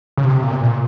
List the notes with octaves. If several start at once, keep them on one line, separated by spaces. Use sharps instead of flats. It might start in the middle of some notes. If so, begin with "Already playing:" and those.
C#3
C3
A#2
C3
A#2